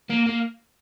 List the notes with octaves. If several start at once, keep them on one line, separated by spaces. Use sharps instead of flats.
A#3
A#3